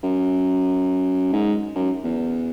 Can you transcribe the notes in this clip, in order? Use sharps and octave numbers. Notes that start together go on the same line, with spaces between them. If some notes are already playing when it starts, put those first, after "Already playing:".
F#2
G#2
F#2
E2